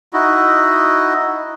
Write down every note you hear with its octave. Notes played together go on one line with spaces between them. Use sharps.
D#4 E4 F#4 D#5